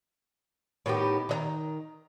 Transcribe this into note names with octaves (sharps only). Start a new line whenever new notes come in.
A2 D#3 B3 G4
D#3 D#5 A#5